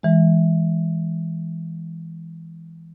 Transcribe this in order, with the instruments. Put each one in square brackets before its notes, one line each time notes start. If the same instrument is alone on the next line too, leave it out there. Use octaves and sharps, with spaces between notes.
[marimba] E3 G#3